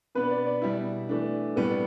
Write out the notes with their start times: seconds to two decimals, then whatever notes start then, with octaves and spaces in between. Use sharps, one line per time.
0.15 B2 B3 D4 B4
0.31 D5
0.46 D5
0.62 B2 G3 E4
1.09 E3 A3 D4
1.56 A2 G3 B3 A4